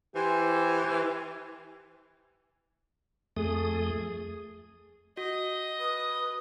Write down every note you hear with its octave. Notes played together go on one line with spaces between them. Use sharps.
E3 G4 C5 G#5
F2 A3 G#4 D#6
F#4 D#5
B4 D#6